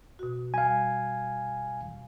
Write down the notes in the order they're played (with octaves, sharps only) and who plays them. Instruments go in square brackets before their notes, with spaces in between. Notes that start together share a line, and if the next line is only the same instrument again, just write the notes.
[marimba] B2 F#4
[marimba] G3 [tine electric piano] F5 G#5